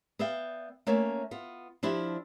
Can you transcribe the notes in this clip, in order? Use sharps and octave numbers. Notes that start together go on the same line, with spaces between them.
B3 D5 E5 F5 G5
A3 A#3 C#4 C#5 E5
B3 F4
F3 D4 E4 G4